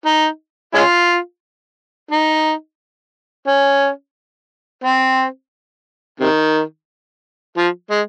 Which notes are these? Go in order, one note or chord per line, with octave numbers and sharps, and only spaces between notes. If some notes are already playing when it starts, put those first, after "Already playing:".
D#4
G#3 C#4 F4
D#4
C#4
C4
C3 D#3
F3
G#3